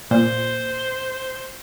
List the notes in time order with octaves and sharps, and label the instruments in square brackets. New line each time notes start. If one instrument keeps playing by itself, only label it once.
[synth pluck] A#2 [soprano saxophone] C5